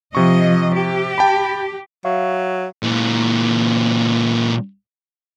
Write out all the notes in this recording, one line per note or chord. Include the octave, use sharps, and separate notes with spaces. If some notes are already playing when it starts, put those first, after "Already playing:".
C3 F3 D#5 C#6
G4
G5 A5 B5
F#3 E5 F5 C#6
A#2 E3